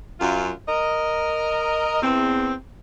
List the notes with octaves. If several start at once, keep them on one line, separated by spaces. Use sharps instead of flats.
F#2 F4
A#4 D#5
E2 C4